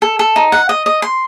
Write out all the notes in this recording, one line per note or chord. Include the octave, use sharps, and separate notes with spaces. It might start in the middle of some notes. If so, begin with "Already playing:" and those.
A4
A4
D#4
F#5
D#5
D#5
C6